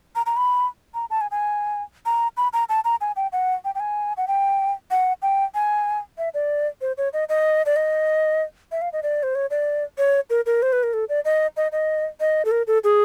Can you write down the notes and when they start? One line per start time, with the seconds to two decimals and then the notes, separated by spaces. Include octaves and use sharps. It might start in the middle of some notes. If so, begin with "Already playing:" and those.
0.16 A#5
0.26 A#5
0.37 B5
0.94 A#5
1.10 A5
1.21 G#5
1.31 G#5
2.06 A#5
2.37 B5
2.53 A#5
2.69 A5
2.85 A#5
3.01 G#5
3.16 G5
3.32 F#5
3.65 G5
3.75 G5
3.80 G#5
4.17 F#5
4.28 G5
4.91 F#5
5.22 G5
5.55 G#5
6.18 E5
6.34 D5
6.81 C5
6.98 C#5
7.13 D#5
7.29 D#5
7.66 D5
7.76 D#5
8.72 E5
8.82 F5
8.93 D#5
9.03 D5
9.23 C5
9.35 C#5
9.50 D5
9.98 C#5
10.30 A#4
10.46 A#4
10.62 C5
10.73 B4
10.83 A#4
10.94 A4
11.09 D5
11.25 D#5
11.57 D#5
11.72 D#5
12.20 D#5
12.45 A4
12.51 A#4
12.67 A4
12.84 G#4